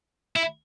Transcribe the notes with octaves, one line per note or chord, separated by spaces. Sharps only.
E4